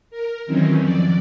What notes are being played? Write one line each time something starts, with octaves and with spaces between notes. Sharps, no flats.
A#4
D#3 E3 F#3 C4 C#4
F2 D5